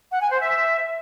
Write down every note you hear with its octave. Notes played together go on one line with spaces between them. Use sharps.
F#5
G#5
C5
E5